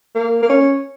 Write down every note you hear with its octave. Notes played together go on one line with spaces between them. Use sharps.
A#3
A#3
C#4